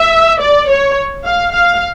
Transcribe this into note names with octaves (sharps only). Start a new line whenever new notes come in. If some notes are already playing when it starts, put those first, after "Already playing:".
Already playing: E5
D5
C#5
F5
F5